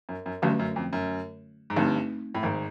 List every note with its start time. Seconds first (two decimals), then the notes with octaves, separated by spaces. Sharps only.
0.09 F#2
0.26 F#2
0.42 G1 G2 D3 F#3 A3 C#4 F#4
0.59 F#2
0.76 F2
0.93 F#2
1.70 G#2
1.76 G1 G2 A3 C4 D#4
2.35 A2
2.43 G#1 G#2